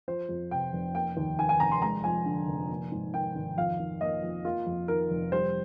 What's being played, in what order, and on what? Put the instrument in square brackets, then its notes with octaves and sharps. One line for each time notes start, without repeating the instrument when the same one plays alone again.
[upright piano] F3 C5
F2
C3 G5
F1
A#3 G5
D#2
D#3 G#5
G#5
F1 A#5
C6
G#3 A#5
F2 G#5
D3
F1
A#3
G#2
D#3 G5
G#1
F2 F5
D#3
A#3 D#5
F2
A#3 F4
F2
D#3 A#4
F1
G3 C5